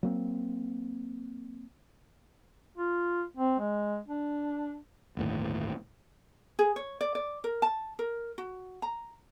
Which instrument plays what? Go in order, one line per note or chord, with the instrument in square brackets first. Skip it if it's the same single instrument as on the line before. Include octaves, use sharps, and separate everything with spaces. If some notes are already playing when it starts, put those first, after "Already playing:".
[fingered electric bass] F#3 A#3 C4
[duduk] F4
C4
G#3
D4
[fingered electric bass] G1 D#2 A2
[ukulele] G#4
C#5
D5
D5
A#4
A5
A#4
F#4
A#5